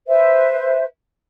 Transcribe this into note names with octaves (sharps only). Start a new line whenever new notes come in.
B4 C5 E5